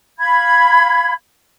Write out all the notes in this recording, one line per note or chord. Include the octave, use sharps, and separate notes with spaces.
F5 B5 G#6